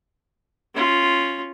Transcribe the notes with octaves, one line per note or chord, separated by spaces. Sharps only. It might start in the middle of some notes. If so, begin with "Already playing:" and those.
C#4 F4